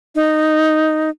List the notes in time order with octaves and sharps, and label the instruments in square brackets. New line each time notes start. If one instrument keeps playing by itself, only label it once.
[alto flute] D#4